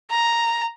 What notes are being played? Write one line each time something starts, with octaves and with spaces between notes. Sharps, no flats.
A#5